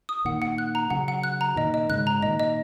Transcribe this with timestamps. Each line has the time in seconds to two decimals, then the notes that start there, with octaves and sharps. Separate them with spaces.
0.09 D#6
0.25 A#2 D#3 F#5
0.42 F#5
0.58 F#6
0.75 A#5
0.90 C#3 F#3 F#5
1.08 F#5
1.23 F#6
1.41 A#5
1.56 A#2 D#3 D#5
1.74 D#5
1.90 G#2 C#3 F#6
2.07 A#5
2.22 A#2 D#3 D#5
2.40 D#5